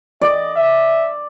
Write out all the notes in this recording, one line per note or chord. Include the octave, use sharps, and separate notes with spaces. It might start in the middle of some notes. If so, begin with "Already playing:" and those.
D5 D#5
E5